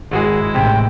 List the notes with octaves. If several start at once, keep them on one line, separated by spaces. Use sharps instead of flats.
G#1 G#3 E4 F#4 G#4
A1 A2 C3 D#3 G5